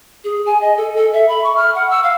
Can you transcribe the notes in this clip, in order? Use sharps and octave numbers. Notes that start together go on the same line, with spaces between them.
G#4
G#5
D#5
A4
A4
E5
B5
C#6
F6
F#5
E6
F5